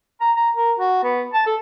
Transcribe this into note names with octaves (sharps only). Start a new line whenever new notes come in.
A#5
A#5
A#4
F#4
B3
A5
A4